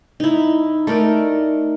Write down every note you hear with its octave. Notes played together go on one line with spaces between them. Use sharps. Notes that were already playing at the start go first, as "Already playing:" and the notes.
D#4 E4
A3 D#4 A#4 D5